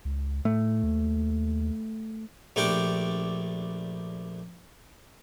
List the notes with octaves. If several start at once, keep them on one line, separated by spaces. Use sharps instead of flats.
C#2
A2 A3
D#2
A#1 A3 D4 G4 D6